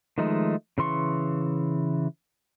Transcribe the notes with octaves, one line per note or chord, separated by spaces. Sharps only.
D#3 F3 G#3 A3 D#4
C#3 E3 C6 C#6